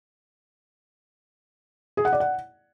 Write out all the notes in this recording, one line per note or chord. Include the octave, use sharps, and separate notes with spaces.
G#4
F#5
D5
F#5